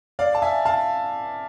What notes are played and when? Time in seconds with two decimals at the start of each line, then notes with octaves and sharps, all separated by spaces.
0.19 D5 F5
0.35 A5
0.42 E5 G#5
0.65 F5 A5